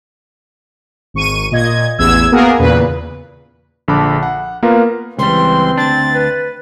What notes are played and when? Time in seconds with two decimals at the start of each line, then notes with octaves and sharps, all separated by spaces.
1.14 G#1 C#6 D#7
1.51 A#2 D#5 G#6
1.99 A1 E2 E6 G#6
2.32 A#3 B3 F#4 G#4 A#4
2.58 E2 A#2 C#3 B4
3.88 A#1 D3 A5 B5 D6
4.23 F#5
4.63 A#3 B3 F4 A#4 B4 F5
5.19 C#2 E3 G3 C4 C6
5.78 D2 D4 A6
6.12 B4